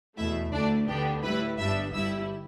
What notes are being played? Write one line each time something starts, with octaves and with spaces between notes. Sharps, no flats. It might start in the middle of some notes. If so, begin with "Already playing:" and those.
E2 B2 A3 E4 E5
D2 D3 A3 D4 D5
D2 D3 B3 D4 G4 G5
A2 G3 E4 B4 B5
G1 G2 G3 B3 D4 E5 E6
G1 G2 G3 E4 E5 E6